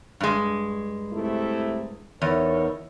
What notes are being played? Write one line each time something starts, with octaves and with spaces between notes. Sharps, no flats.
G2 G#3
C3 A3 E4
E2 D#4 A#4 C#5